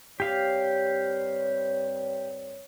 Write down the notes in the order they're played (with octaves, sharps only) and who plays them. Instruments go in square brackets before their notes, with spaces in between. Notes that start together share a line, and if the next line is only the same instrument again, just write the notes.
[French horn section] G2 C4 C#5 [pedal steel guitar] G4 F5